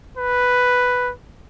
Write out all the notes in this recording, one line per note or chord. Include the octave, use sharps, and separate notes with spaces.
B4